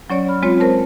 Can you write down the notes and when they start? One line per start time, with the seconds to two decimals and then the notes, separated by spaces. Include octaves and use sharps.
0.10 F#3 C#4 C#5 D5
0.28 B5 F6
0.43 G#3 C4 F4 C#5
0.60 A#4 C5 A5